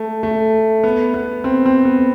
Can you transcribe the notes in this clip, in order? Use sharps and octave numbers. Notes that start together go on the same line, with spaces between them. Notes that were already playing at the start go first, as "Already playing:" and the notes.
Already playing: A3
A3
B3
B3
C4
C4
B3